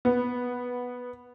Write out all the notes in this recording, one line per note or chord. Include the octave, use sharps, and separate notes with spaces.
B3